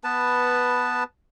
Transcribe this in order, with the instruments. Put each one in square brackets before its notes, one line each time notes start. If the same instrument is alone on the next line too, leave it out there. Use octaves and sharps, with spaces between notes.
[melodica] B3 B4 A5